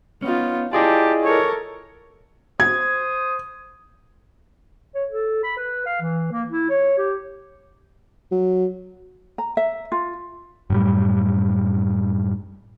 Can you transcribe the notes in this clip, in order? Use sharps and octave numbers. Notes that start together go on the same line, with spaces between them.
B3 C#4 D#4 F4
E4 F4 G4 G#4 D5 D#5 A5
A4 A#4 C#5
C5 D#6 G#6
C#5
A4
B5
B4
F5
E3
A#3
E4
C#5
G4
F#3
A#5
E5
F4
F#2 A2 G3